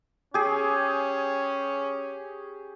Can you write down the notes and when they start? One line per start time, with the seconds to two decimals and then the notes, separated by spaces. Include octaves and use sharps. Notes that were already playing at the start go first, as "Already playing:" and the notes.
0.34 C#4 G4 G#4